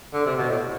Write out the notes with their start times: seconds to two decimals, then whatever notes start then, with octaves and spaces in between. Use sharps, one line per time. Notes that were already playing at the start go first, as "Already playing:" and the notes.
0.13 D3
0.26 C3
0.38 B2
0.50 A2